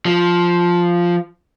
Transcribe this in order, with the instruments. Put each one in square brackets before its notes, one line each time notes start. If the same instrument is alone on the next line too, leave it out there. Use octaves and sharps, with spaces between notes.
[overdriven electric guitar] F3